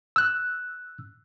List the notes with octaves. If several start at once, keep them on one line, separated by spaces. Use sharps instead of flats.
E6 F#6